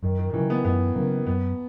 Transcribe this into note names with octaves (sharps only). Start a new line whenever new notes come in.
F#2 D#3
D#3
D#3
C#3 E3 F#3
B3
F#2 B3
C#3 F#3 A#3
F#2 B3